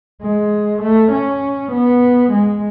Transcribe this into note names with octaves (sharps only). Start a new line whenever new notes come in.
G#3
A3
C#4
B3
G#3